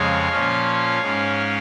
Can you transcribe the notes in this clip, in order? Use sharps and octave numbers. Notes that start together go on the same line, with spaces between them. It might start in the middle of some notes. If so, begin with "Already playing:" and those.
Already playing: F2 C#3 G#3 C#5 F5
A#2 F3 C#4
G#2 G#3 C#4